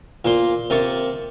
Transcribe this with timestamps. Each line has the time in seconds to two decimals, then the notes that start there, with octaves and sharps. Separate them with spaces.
0.25 A#2 A#3 C5
0.70 C3 A#3 A5 C#6